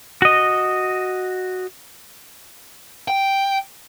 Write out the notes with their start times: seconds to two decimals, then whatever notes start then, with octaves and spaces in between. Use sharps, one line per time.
0.22 F#4 D#5
3.08 G5